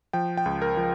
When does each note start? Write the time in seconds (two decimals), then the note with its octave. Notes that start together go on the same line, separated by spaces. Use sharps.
0.13 F3 G5
0.37 G5
0.46 C#2
0.62 A#4
0.77 F3